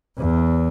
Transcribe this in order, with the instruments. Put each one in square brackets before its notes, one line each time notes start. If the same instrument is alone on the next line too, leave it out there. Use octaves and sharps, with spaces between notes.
[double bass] E2